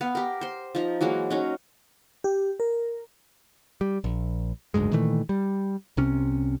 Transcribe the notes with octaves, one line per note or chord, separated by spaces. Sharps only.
B3 F5
G4 A#4
C5 C6
F3 D#4 A#5
E3 F#3 G#3 A#3
F#3 C#4 D#4
G4
A#4
G3
A#1
F#1 D2 G#2 G#3
A#2 D#3 E3 A3
G3
C2 C3 C#4